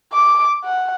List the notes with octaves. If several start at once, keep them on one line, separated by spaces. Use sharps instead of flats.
D6
F#5